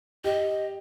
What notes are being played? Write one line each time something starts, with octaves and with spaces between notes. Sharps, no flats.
G4 D#5